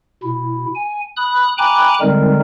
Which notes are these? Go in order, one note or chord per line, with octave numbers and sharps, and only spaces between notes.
B2 E4
G#5
B5 D#6 F#6
G5 G#5 A#5 B5 D6 F#6
D3 G3 G#3 C4 D#4 A#4